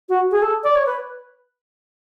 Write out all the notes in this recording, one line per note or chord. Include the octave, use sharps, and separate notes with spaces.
F#4
G#4
A4
D5
C#5
B4